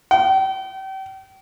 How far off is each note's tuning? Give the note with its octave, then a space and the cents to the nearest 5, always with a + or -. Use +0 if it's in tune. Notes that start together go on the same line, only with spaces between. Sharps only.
G5 -35